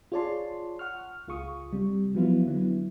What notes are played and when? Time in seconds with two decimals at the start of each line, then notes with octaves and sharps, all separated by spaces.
0.12 F4 G#4 C#5 D5 A5 C6
0.79 F#5 C#6 F6
1.28 C#2 F4 G#4 C#6 D#6
1.73 C3 G3
2.15 F3 F#3 B3 E4 F4
2.46 D3 F#3 B3 E4